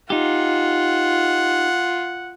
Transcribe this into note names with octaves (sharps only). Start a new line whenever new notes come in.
D#4 F4 G4 F#5